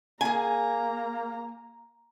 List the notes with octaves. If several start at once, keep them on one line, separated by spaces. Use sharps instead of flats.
A#3 G#4 G#5 A#5